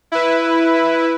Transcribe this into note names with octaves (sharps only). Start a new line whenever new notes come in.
E4 B4